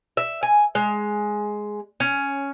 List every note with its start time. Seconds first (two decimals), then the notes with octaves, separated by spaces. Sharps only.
0.17 E5
0.43 G#5
0.75 G#3
2.00 C#4